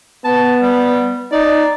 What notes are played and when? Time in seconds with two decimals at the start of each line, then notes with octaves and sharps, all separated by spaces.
0.25 B3 A5
0.60 G3
1.32 D#4 D5